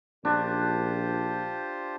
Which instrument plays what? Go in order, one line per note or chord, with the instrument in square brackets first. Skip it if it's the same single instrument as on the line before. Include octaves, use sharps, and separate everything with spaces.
[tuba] A#1 [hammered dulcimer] D4 [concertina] F4 G4 C5